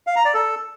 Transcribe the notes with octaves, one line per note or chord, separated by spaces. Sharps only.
F5
A#5
D5
A4